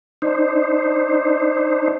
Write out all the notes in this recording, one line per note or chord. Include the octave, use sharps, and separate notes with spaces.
D4 D#4 C5